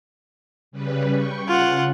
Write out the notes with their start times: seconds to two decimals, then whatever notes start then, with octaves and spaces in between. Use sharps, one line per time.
0.71 C#3 G3 B4
1.12 G5 C#6
1.48 C#3 F4 F#5